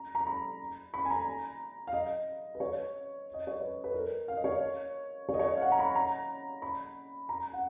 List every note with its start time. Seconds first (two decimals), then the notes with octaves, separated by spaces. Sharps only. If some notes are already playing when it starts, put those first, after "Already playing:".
Already playing: A#5
0.15 A#5
0.27 B5
0.94 B5
1.05 G#5
1.10 A#5
1.87 F5
1.93 D#5
2.55 B4
2.60 C#5
3.34 D#5
3.47 C#5
3.60 B4
3.84 B4
3.94 A#4
4.28 F5
4.37 D#5
4.44 C#5
5.29 C#5
5.34 D#5
5.39 C#5
5.57 F5
5.61 F#5
5.72 A#5
5.79 B5
5.96 A#5
6.62 B5
7.29 A#5
7.53 F#5